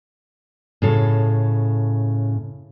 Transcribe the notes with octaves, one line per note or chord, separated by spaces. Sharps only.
A2 C#3 A4